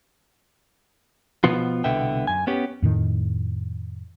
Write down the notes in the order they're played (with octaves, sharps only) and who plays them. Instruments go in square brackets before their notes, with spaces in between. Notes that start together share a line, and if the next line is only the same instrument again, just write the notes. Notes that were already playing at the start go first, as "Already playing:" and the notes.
[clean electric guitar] B2 F3 B3 F4
C2 B2 D3 B3 E5 G5
F#2 G#5
B3 C#4 G4
[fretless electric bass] F2 A2 D#3